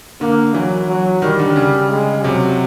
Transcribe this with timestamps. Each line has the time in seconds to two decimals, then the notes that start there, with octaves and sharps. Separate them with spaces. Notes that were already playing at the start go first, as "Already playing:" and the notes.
0.21 D3 A#3
0.54 E3 F#3
0.88 F#3
1.22 D#3 G3
1.39 D3
1.56 C#3
1.90 G#3
2.23 C3 F#3